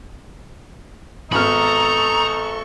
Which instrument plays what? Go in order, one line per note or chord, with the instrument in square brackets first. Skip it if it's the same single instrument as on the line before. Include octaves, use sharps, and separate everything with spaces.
[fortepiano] G#1 B3 F6 [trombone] D#4 [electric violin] A4 C#6 [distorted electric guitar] A#5 B5